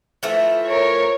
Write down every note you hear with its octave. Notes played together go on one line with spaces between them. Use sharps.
E3 F3 A3
A#4 C#5